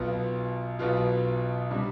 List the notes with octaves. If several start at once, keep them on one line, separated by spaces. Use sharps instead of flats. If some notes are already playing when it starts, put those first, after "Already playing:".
Already playing: B1 B2 B3 F4
B1 B2 B3 F4
C3 G3 D4